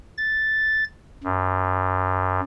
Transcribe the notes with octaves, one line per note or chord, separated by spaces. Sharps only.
A6
F#2